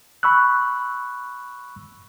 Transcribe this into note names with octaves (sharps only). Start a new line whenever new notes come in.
B5 C#6 E6 F#6